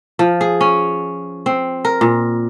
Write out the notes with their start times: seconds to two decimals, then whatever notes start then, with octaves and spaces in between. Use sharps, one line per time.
0.19 F3
0.41 G#4
0.61 C#4
1.46 C4
1.85 A#4
2.01 A#2